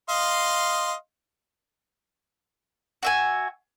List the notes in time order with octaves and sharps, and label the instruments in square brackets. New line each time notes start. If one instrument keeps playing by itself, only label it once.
[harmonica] D#5 F5 C6
[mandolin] F#4 E5 G#5